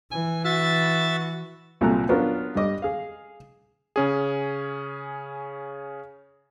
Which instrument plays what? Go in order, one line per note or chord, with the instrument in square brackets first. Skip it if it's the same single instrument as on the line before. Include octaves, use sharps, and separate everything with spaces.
[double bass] E3 [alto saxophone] G#5
[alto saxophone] F#4 [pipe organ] E5 A6
[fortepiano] C2 A#2 F#3 A4 A#5 F#6
F#3 B3 C#4 D4 F4 A#4
G2 G3 D#5 D6
G#4 F5
[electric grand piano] C#3 C#4 G#4